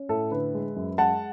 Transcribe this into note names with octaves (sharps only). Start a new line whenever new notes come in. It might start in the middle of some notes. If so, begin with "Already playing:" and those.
Already playing: C#4
A2 A4
D3 B4
G#3
F#2
G#3 F#5 A5